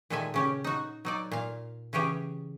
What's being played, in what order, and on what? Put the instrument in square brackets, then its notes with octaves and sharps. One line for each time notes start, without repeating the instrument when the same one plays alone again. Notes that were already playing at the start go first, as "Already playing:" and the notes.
[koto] A#2 D#3 G#3 A4 E5 G#5
C#3 C#4 G4
D#4 F#4
F#3 D#4 D5
A#2 F5
C#3 E3 C#4 G4 G#4